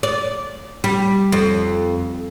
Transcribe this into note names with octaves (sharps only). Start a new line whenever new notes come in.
D5
G3
F2